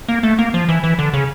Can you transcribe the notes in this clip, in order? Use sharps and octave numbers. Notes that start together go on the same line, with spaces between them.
A#3
A3
A#3
F3
E3
E3
D3
C#3